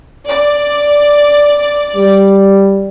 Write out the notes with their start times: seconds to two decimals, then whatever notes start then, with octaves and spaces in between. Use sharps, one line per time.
0.28 D5
1.96 G3